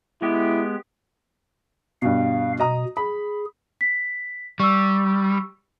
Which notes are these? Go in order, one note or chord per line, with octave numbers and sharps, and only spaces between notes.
G#3 B3 E4 G4
G2 B2 F5
B2 D#5 A#5 D#6
G#4 B5
B6
G3 C#6 E6